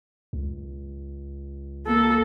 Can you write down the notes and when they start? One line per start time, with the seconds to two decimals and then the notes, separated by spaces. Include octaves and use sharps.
0.33 C#2
1.86 A#3 A4